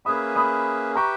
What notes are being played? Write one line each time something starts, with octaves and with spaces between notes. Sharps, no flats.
A#3 C#4 G#4 B4 E5 B5 D#6
B5 D#6
G4 B4 E5 G5 A#5 C#6